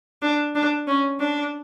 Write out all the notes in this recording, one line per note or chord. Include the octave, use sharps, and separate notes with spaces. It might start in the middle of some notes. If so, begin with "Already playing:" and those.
D4
D4
C#4
D4